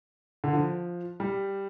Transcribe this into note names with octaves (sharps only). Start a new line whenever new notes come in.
D3
F3
G3